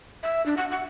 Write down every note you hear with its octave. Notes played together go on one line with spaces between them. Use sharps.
E5
D4
F#5
F#5